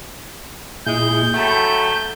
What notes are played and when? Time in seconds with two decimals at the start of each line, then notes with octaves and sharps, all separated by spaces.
0.86 A#2 G#3 E4 G#4 G6
1.34 F#3 A3 G5 A5 B5